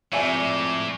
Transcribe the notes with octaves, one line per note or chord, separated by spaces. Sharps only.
F2 A2 G#3 D5 E5 G#5